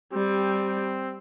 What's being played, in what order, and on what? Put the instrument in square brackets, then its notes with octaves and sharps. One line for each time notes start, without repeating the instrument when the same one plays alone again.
[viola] G3 [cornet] C4